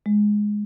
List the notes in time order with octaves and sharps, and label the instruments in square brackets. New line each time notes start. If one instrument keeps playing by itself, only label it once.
[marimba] G#3